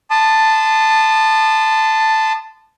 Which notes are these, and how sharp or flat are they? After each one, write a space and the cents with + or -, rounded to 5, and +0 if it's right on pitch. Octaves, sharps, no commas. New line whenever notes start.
A5 +0 C6 -40 D#6 -35